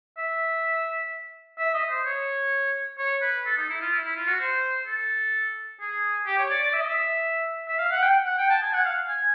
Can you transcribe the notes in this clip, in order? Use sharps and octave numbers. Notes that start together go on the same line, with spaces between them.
E5
E5
D#5
C5
C#5
C#5
B4
A4
D#4
E4
F4
E4
E4
F4
F#4
C5
A4
G#4
G4
C#5
D5
D5
E5
D#5
E5
E5
F5
F#5
G5
F#5
G5
A5
G#5
F#5
F5
G#5